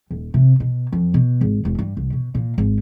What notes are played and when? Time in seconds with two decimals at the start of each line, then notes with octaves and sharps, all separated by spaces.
0.11 D#1
0.34 C3
0.60 B2
0.92 F2
1.14 B2
1.41 G#1
1.65 E1
1.79 G2
1.97 C2
2.13 B2
2.35 A#2
2.58 G#1